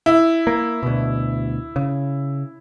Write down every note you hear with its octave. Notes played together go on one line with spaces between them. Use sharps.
E4
A#3
D2 B2
C#3